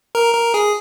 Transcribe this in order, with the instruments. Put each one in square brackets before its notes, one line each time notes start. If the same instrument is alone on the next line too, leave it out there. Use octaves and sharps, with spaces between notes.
[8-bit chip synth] A#4
A#4
G#4